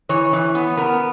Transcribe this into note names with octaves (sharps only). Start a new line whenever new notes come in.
E3 C#5
E3
B3
B3 A#4